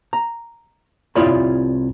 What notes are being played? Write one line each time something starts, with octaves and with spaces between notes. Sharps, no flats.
A#5
C2 E4 F4 C#5 D5 B5